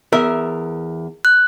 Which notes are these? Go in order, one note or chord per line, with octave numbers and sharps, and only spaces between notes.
E2 A#4 E5
F#6